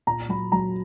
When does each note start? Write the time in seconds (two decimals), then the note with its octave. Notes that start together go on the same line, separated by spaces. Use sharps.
0.07 A#2 A#5
0.29 F#3 B5
0.52 F#3 A#5